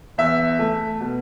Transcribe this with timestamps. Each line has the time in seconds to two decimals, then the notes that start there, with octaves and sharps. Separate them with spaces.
0.18 E2 E5
0.59 A3
1.01 B2